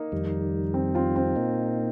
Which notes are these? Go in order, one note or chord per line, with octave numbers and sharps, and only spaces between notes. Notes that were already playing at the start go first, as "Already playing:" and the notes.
Already playing: A#3 D#4
F2 D#3 G3
C4
C4 F4
C4
A#2 A#3 D#4